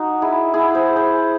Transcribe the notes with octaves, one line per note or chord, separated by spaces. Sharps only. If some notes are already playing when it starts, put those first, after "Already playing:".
Already playing: D#4 F#4
E4 G#4
E4 G#4
G#4 C5
G#4 C5